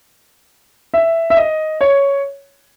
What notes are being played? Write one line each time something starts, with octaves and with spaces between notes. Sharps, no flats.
E5
E5
D#5
C#5